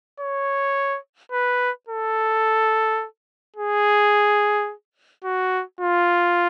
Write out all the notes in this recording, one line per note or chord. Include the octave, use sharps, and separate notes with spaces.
C#5
B4
A4
G#4
F#4
F4